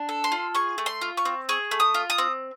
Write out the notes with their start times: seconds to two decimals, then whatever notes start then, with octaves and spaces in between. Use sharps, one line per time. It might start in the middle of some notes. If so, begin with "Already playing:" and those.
Already playing: D4
0.09 A4
0.24 C6
0.32 F4
0.55 G#4 C#6
0.78 A3
0.86 C6
1.01 F4
1.17 C#6
1.25 C4
1.49 G#4 C#6
1.71 A3
1.80 D#6
1.94 F4
2.10 D#6
2.18 C4